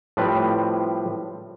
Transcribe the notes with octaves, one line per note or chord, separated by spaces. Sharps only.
A2 F3 G3 C4 B4